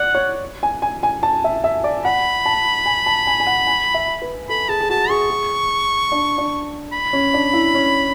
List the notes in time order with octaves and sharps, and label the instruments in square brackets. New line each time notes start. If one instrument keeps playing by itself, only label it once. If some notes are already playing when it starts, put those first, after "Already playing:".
Already playing: [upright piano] D5 [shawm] F#5
[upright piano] C#5
G#5
G#5
G#5
A5
E5
E5
D5
[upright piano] F#5 [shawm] B5
[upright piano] A5
G#5
A5
G#5
G#5
F#5
G#5
E5
B4
[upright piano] A4 [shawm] B5
[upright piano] G#4 [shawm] A5
[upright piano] G#4
[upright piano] F#4 [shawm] A5
[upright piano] G#4 [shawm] C#6
[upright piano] G#4
D4
D4
[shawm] B5
[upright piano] C#4
D4
E4
C#4